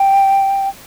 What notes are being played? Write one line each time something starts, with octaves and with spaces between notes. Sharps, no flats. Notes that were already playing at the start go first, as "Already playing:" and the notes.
Already playing: G5